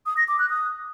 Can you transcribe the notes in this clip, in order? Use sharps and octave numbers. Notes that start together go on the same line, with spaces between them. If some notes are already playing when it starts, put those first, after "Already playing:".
D#6
A#6
D6
F#6
D#6